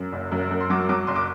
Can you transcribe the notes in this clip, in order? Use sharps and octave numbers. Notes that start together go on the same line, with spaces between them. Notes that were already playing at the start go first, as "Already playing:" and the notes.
Already playing: F#2
F#1
F#2
F#2
C6
F#3 D6
F#3 D6
F#1 C6
D6